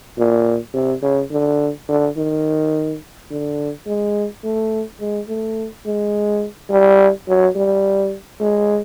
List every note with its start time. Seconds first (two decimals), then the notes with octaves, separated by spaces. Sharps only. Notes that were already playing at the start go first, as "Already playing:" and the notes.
0.18 A#2
0.74 C3
1.02 C#3
1.31 D3
1.88 D3
2.17 D#3
3.30 D3
3.87 G#3
4.44 A3
5.00 G#3
5.28 A3
5.86 G#3
6.70 G3
7.28 F#3
7.56 G3
8.40 G#3